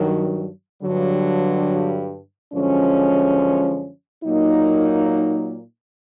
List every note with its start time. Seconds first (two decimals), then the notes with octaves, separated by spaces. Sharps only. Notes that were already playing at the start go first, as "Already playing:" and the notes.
Already playing: G2 D#3 F#3
0.82 G2 D3 F#3
2.53 F#2 D3 F3 G#3 C#4
4.24 A#2 F#3 A#3 D#4